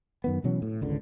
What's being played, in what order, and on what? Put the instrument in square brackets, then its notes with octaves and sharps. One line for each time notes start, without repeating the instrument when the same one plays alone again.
[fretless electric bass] F#2 D#3 B3
B2 E3 F#3 C#4
A2
G#1 C#2 D3